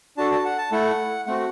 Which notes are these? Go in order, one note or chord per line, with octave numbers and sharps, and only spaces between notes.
D4 F#4 A4 A5
A5
F#5
A5
A3 E4 A4 F#5
A3 C4 F#4 F#5